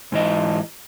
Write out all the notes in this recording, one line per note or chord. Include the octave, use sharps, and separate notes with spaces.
G#2 E3 D#5